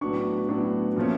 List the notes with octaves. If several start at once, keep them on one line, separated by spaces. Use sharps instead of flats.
A2 F#3 B3 D4 C#6
A2 F#3 B3 D4
A#2 F3 A3 C#4